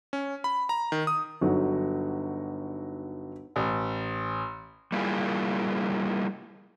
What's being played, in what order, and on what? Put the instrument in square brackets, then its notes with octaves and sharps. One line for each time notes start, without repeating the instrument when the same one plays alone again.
[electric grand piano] C#4
B5
A#5
D#3
D#6
[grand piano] G1 F#3 D#4
A1
[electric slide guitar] G3 A#3 E4 F4 G#4